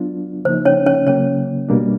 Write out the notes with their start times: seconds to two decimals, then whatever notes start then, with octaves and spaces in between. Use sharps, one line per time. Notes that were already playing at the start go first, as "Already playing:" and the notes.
Already playing: F#3 B3 D4 F4
0.45 C#3 F3 A#3 D#4 C5
0.65 C#4 C#5
0.86 C#4 C#5
1.06 C#3 F#3 A#3 C#4 C#5
1.68 B2 G3 A#3 D4